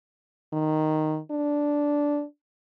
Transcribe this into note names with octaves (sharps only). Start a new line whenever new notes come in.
D#3
D4